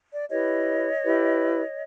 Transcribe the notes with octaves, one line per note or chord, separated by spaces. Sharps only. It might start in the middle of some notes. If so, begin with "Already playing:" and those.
D5
E4 G4 B4 C#5 D#5
E4 G4 B4